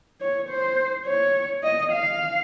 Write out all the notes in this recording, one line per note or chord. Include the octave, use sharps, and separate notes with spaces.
C#5
C5
C#5
D#5
F5